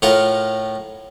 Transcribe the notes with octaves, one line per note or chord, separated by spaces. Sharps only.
A2 F4 A#4 F#5